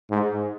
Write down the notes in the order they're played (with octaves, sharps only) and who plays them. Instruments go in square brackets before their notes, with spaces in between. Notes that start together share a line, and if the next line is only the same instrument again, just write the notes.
[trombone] G#2